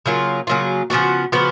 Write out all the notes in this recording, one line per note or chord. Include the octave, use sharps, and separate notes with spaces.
C#3 F#3 A#3 F4
C#3 F#3 A#3 F4
C#3 F3 B3 F#4
C#3 F3 B3 F#4